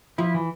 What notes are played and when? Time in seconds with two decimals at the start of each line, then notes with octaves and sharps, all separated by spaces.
0.18 F3 E4
0.34 E3